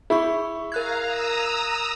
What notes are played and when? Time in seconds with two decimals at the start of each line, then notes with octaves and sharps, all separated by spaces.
0.10 E4 G#4 B5 C#6
0.72 A#4 F5 A#5 F#6 G#6
1.04 A#5 D#6 E6